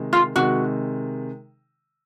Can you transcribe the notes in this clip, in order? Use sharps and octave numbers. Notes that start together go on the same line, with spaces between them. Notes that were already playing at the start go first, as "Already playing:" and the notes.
Already playing: C3 D#3 G#3
F4
C3 D#3 G#3 F#4